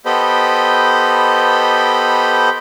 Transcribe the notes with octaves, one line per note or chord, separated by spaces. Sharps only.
B3 G4 A4 C5 D#5 B5